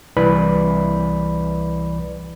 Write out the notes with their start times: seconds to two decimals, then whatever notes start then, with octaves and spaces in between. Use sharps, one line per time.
0.17 C2 E3 B4 D5 B5